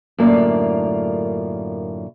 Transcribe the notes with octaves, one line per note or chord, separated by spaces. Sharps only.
F#2 A2 D3 A#3 F4 D5